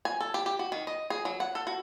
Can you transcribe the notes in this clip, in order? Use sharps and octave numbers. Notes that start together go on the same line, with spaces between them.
G#5
A4
G4
G4
F#4
D#3
D#5
G#4
F#3
F#5
A4
F#4